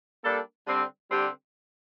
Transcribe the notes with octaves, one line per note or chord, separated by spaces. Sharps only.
G3 A#3 D4 A4
D3 G3 C4
D3 G3 C4 G4